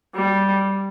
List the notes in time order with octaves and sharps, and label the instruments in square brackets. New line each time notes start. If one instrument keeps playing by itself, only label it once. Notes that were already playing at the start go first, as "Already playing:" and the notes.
[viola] G3